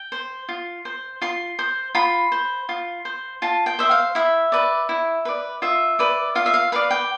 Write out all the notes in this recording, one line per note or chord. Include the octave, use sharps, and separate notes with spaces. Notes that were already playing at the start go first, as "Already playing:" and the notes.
Already playing: G5
C5
F4
C5
F4 C6
C5
F4 B5
C5
F4
C5
F4 A5
G5
C5 E5
F5
E4 E5
B4 D5
E4
B4 D5
F4 E5
B4 D5
F4 F5
E5
F5
B4 D5 F5
G5